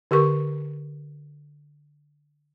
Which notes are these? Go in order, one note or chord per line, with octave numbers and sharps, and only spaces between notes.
D3 G4 A#4 C#6